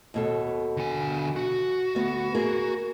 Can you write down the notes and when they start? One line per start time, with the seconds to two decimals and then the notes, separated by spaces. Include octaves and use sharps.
0.14 D#2 B2 A4
0.77 D3 G#5
1.36 F#4
1.95 D2 B3
2.35 A#3 G#4 A#4